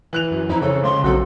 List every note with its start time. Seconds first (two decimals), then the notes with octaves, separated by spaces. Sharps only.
0.13 E3 F#6 F7
0.31 F#2
0.49 F2 D#4 E4
0.61 C#3 A4 C5 C#5
0.83 C#2 C6
1.04 A#1 F#3 C4 F#4 A4